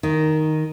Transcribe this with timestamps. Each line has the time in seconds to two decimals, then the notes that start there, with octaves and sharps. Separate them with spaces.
0.03 D#3